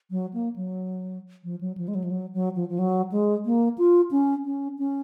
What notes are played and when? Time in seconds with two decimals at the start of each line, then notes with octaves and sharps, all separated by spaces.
0.11 F#3
0.34 A#3
0.56 F#3
1.44 F3
1.61 F#3
1.78 F3
1.88 G#3
1.95 F#3
2.04 F3
2.11 F#3
2.34 F#3
2.55 F3
2.69 F3
2.79 F#3
3.12 G#3
3.45 A#3
3.78 F4
4.11 C#4
4.45 C#4
4.78 C#4